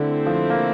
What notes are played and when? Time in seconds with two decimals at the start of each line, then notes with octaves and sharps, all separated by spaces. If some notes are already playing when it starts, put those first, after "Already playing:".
Already playing: D3 A3 C4 E4 A4 C5
0.26 F3
0.50 A#3